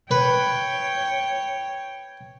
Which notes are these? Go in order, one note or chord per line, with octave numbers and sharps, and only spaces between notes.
B4 C#5 G5